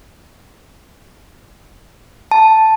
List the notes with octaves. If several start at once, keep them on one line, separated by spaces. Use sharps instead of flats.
A5